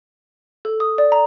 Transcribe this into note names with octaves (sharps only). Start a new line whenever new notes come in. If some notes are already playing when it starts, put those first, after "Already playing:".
A4
D#6
D5
A#5